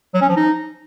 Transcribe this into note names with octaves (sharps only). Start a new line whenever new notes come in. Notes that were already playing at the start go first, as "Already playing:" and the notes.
F#3
C#4
F3
D#4